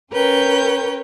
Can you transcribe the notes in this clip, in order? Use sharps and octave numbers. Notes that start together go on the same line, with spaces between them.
C#4 A#4 B4 C#5 G5 G6